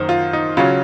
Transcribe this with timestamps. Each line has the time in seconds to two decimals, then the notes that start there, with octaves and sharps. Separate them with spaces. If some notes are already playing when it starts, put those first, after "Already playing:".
Already playing: F#2 D#3 A#3 D#4 C5
0.09 F4
0.33 D#4
0.57 C#3 F#3 C#4 F4